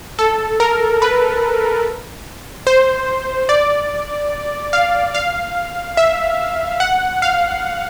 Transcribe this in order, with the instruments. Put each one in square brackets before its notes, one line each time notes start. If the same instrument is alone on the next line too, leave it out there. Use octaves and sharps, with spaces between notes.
[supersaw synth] A4
A#4
B4
C5
D5
F5
F5
E5
F#5
F5